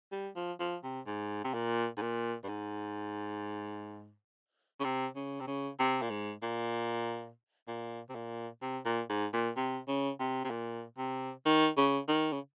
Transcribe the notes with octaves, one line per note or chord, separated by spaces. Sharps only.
G3
F3
F3
C3
G#2
C3
A#2
G#2
A#2
G2
G#2
C#3
C3
C#3
C3
C#3
C3
A#2
G#2
A#2
A#2
C3
A#2
C3
A#2
G#2
A#2
C3
C#3
C3
C3
A#2
C3
D#3
C#3
D#3
C#3